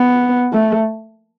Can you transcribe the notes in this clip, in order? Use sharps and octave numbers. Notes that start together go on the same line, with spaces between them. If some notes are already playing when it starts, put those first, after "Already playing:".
Already playing: B3
A3